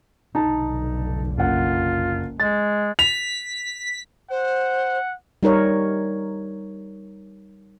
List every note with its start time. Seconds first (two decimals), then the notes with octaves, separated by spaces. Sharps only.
0.35 F1 B1 D3 D#4 A5
1.38 F#1 F4 F#5
2.40 G#3 A6
2.99 B6 F7
4.30 C5 F#5
5.43 G3 D#4 A#4 C#5